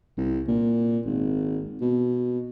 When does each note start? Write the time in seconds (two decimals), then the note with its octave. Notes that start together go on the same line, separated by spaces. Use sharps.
0.17 C2
0.48 A#2
1.06 G#1
1.81 B2